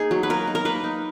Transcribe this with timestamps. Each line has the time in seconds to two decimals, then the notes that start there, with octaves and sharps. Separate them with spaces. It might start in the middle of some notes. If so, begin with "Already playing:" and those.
Already playing: A#3 D#4 G#4
0.11 F#3
0.23 B4
0.30 A#3 A#4
0.47 D#4
0.55 A#4
0.65 A#3 B4
0.84 D#4